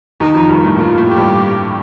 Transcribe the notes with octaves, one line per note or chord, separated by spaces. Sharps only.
D#2 D#3 D#4
F2 F3
G2 G3
A#3
A2 A3
A#2 A#3 F4
A2 A3
A3 G4
G2 G3